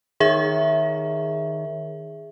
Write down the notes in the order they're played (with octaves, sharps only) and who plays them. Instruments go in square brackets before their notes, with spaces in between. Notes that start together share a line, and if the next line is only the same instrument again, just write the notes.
[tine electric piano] D#3 C#5 [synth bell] G#4 E5